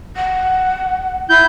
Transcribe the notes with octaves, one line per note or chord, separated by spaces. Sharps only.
F#5
E4 G6